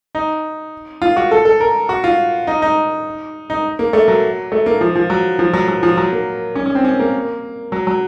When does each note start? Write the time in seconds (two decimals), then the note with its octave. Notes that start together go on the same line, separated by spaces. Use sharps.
0.15 D#4
1.02 F4
1.17 F#4
1.31 A4
1.45 A4
1.60 A#4
1.89 F#4
2.04 F4
2.47 D#4
2.62 D#4
3.50 D#4
3.79 A#3
3.93 A3
4.08 F#3
4.52 A3
4.66 A#3
4.81 F3
4.96 F3
5.10 F#3
5.39 F3
5.53 F#3
5.68 F#3
5.83 F3
5.97 F#3
6.12 A#3
6.55 C#4
6.66 C#4
6.75 C4
6.84 C#4
6.99 A#3
7.72 F#3
7.87 F#3